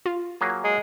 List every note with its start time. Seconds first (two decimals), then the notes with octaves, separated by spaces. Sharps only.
0.06 F4
0.41 F#3 A#3 G#4
0.64 G#3